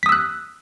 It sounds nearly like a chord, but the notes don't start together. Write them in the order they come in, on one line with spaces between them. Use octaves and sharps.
B6 D#6 E6 F#6